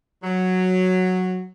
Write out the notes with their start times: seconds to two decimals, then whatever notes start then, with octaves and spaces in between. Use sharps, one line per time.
0.24 F#3